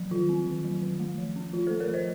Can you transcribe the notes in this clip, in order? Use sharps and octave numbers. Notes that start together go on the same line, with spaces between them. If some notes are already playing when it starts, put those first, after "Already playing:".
Already playing: F3 F#3
D#3 F4
C4
D#3
F#3
D#3
A3
F3
C#4
F3 F4
A4 C5
A3
A#4 C#5
F3 C5 D#5